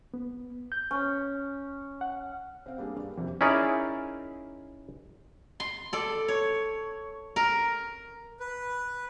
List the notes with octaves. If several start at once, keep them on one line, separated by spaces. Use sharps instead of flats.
B3
G6
C#4
F#5
C4 F5
G3 A#3 D4 G#4
G2
F2 C3
C#4 D#4 E4 G#4 A#4 D5
C6
A4 D5
C#5
A#4
B4